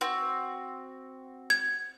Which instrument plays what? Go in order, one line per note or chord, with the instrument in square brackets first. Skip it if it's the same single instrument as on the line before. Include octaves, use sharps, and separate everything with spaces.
[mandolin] C4 F#4
[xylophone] G#6